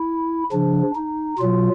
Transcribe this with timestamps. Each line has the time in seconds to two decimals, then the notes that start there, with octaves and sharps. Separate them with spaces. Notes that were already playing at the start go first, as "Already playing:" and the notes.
Already playing: E4
0.52 C#3 F3 D4
0.95 D#4
1.39 B2 F#3 F4